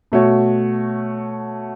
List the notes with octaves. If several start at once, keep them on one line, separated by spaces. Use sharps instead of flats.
B2 A3 F#4 C#5